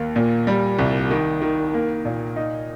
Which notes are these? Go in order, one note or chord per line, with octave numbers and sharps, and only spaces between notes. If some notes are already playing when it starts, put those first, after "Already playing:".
Already playing: D#2 A#3
A#2
G3
C2
D#3
D#3
A#3
A#2
D#4